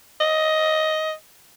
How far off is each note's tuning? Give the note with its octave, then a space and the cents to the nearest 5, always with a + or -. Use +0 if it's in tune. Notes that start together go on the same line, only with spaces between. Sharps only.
D#5 +10